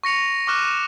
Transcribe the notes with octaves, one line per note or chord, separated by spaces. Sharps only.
C#6 A#6 C#7 F7
C#6 D6 F6 F#6 E7